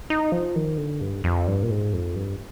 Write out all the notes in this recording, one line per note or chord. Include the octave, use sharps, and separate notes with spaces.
D#4
F3
D#3
D3
G2
F2
G2
A#2
G#2
F2
G2